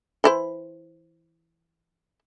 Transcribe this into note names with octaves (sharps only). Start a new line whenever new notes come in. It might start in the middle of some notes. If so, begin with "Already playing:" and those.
E3 E4 C5